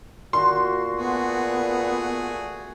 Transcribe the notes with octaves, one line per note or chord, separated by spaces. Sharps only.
A#2 F#4 C6
A3 B3 F#4 G#4